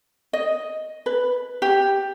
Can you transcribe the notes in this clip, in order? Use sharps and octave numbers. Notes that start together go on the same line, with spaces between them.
D#5
B4
G4